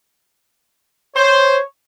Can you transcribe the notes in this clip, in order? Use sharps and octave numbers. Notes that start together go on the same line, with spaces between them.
C5 C#5